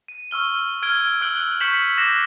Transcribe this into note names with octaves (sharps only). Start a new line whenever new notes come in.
D#7
C#6 E6 F6 G7
F6 G#6 D7 G7
E6 F#6 D7 F#7 G7
C#6 G6 B6 C#7 E7 F#7
D6 F#6 G6 A#6 C7 E7